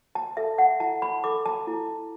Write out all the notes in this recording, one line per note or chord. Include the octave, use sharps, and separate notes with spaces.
A5
A4 E5
F#5
E4 A5
B5
A4 D6
A5
E4